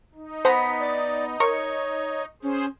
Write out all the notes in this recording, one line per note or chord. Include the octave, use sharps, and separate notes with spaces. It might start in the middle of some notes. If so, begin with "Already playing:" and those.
D#4
B3 C5 A#5 B5
D5
A#4 C#5 C#6
C#4 G#4 C5